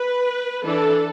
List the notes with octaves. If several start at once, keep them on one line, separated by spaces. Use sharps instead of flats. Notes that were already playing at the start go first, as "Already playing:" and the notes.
Already playing: B4
E3 D4 A4